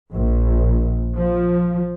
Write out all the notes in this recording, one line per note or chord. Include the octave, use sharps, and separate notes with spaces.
A#1
F3